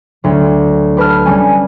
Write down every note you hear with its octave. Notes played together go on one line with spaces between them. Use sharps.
D2 F#3
G4 B4 A5 F6
G3 C#4 G#5